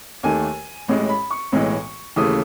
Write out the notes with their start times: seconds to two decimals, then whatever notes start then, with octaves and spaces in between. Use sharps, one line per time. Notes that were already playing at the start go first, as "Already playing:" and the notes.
0.23 D#2 D#3 A3 G#5
0.88 A1 A2 G#3
1.09 B5
1.31 C#6
1.52 B1 A2 E3 G#3
2.16 D#2 C#3 E3 A3 D#6